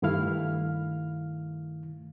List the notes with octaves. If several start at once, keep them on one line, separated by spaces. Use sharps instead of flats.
G2 D#3 A3 E4 F5 F6